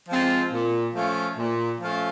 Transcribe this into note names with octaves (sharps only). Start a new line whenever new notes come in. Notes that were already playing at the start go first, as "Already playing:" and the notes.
F3 G#3 C4 F4
A#2
F3 A3 C#4 F4
A#2
F3 A3 C#4 F4